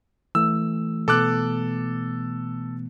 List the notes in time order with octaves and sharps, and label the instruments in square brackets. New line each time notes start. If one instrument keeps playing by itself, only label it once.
[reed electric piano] E3 A3 [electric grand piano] E6
[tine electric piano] B2 B3 [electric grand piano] A4 D6 F#6